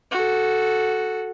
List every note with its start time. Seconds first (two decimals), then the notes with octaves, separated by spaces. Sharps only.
0.11 F#4 A4